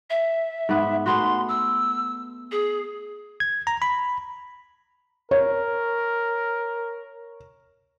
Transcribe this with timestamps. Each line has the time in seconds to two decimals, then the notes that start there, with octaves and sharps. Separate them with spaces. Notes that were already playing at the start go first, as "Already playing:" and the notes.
0.10 E5
0.69 G#2 B3
1.06 A3 B3 F#4 C6
1.49 E6
2.51 G#4
3.40 G#6
3.67 A#5
3.82 B5
5.31 A#4 C#5